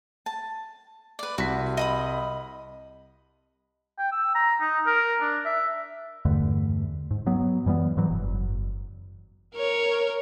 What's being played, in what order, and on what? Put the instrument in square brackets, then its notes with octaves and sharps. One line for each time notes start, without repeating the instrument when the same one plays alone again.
[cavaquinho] A5
B4 D5
[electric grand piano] C2 B6 [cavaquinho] F#4
[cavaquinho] D#5 B5 D#6
[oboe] G5
E6
A#5
D#4
A#4
D4
E5
[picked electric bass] E2 G2 D3 A3
G#2
F#3 B3
F#2 E3 G3 B3
G#2 E3 F#3
F#1
[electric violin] A#4 C#5